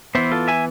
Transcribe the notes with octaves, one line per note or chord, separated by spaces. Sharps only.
E3 B3 C5 E5
F4 A4
E5 G#5